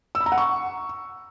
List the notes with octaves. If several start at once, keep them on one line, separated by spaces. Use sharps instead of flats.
E6
B5
A#5
F#5
C#6